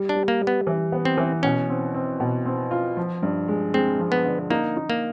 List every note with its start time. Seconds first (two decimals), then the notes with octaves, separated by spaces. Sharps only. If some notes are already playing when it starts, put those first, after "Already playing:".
Already playing: G3
0.09 D4
0.15 G3
0.28 A#3
0.41 G3
0.47 B3
0.67 E3
0.92 B3
1.05 C4
1.17 E3
1.43 B2 C#4
1.69 C4
1.94 C4
2.20 B2
2.46 C4
2.71 F4
2.97 F3
3.23 G2
3.48 G#3
3.74 G#3 C4
3.99 F3
4.12 B3
4.25 D3
4.50 A#3 D#4
4.76 D#4
4.90 A#3